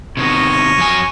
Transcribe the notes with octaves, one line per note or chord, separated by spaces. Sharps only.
C3 D#3 B3 A#4 C#5 D#5
F2 F#3 G#5